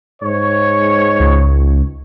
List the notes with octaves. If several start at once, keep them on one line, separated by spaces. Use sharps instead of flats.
G#2 C#5
C#2